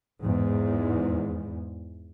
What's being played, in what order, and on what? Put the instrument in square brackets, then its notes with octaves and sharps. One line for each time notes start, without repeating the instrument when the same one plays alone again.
[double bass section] E2 G#2